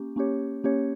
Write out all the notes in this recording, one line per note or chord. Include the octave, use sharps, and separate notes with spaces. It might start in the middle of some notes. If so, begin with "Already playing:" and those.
Already playing: A#3 C#4 G4
A#3 C#4 G4 C#5
A#3 C#4 G4 C#5